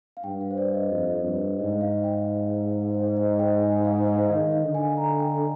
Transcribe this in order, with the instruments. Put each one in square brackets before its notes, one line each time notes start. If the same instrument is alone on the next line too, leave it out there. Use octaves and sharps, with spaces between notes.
[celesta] F5
[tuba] G2 [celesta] G5
[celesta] F5
C5
D5
D#5
[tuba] F2
G2
[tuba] G#2 [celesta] D#5
[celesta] F5
G5
C5
D#5
G5
G#5
F5
D#5
[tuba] D#3 [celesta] D#5
[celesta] F5
[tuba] D3
[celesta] G#5
A#5
G5